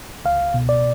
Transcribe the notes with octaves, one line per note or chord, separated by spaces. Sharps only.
C#2 F5
B2
D5